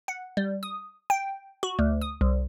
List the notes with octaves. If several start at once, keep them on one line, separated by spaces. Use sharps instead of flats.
F#5
G3
D#6
G5
F#4
D2
D#6
C2